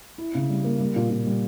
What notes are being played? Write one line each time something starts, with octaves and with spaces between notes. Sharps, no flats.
E4
C#3
G3
A#3
G3
A#2
A#2
G3